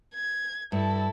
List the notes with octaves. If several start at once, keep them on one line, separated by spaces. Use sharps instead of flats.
G#6
G2 E4 A4